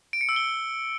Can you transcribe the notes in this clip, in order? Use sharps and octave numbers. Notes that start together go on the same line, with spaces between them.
D7
C#7
E6
G7